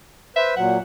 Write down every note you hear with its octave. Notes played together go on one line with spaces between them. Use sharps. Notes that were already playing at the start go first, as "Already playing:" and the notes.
B4 C5 E5
A#2 F#3 F#5